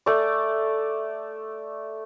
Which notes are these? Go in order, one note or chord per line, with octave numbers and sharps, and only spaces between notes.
A3 D5